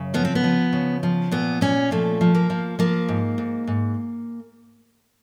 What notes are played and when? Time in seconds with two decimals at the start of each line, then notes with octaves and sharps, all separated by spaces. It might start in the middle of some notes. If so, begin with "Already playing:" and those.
Already playing: F#2 C#3
0.14 F3 B3
0.25 C4
0.35 B3
0.44 F3
0.73 C#3
1.03 F3
1.31 A#2 B3
1.61 A#2 C#4
1.91 F3 A3
2.21 F3
2.35 A#3
2.50 F3
2.79 F3 A#3
3.08 G#2
3.38 G#2
3.67 G#2